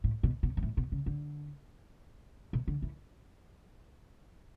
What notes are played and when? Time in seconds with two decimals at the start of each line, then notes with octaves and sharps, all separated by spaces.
0.04 A2
0.23 B2
0.43 B2
0.57 G#2
0.63 A2
0.77 B2
0.92 C#3
1.06 D3
2.53 B2
2.68 D3
2.82 E3